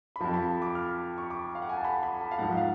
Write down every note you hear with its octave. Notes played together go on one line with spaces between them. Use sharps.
B5
F2 F3 A5
B5
D6
F6
C#6
D6
F5
F#5
G#5
A5
B5
B5
A5
F5
G#2 F3 F#5
F5